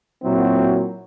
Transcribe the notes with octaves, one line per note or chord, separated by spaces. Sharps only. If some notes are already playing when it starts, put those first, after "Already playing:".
A#2 F#3 C4 E4 F#4